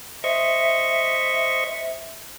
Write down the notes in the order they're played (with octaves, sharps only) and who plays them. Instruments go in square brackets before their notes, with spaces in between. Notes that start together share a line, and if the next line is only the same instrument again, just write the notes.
[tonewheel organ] C5 D#5 C#6 [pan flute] E5